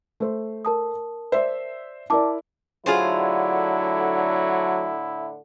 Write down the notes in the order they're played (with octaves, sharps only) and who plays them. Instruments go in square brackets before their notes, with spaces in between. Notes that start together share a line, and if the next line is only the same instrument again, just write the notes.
[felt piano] A3 C5
[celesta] A#4 A5 D#6
[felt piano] C5 D5 E5
[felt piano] E4 A#4 D5 [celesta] A5 D6
[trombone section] A2 D3 [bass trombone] F#3 [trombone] E4 [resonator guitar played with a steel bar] F4 G#4 C5